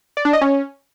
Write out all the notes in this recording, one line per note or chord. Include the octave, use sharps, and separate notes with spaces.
D5
D4
D#5
C#4